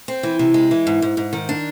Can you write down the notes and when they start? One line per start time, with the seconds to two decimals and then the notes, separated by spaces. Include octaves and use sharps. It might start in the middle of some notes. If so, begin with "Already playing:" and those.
0.08 C4
0.23 E3
0.39 C3
0.54 G#3
0.71 E3
0.87 G#2
1.02 G#2
1.17 G#2
1.33 D#3
1.49 D4